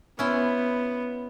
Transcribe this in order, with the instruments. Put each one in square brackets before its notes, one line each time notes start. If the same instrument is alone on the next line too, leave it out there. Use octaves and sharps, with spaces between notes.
[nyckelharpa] B3 [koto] C#4 E4 C5